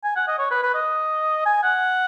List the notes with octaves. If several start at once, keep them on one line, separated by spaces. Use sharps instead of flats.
G#5
F#5
D#5
C#5
B4
B4
D#5
G#5
F#5